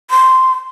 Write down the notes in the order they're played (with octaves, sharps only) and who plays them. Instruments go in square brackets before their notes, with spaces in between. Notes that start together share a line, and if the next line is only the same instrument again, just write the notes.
[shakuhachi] C6